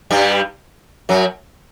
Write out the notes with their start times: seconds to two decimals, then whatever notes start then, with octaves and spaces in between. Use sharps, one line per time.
0.10 G2 G3
1.09 F#2 F#3